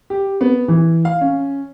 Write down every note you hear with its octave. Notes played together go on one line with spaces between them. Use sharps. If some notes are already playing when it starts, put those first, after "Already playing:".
G4
B3
E3
F5
C#4